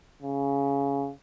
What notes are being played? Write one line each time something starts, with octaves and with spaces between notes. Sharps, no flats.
C#3